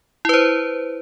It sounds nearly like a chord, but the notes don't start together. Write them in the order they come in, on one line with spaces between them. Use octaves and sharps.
E4 B4 C5